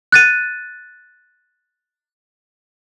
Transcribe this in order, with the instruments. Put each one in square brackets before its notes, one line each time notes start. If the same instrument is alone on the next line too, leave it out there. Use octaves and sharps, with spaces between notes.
[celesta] F#6 A6 D#7